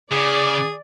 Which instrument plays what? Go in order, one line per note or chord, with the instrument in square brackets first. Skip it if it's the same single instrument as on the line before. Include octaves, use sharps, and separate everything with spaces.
[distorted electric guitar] C#3 [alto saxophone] G#4 [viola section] D5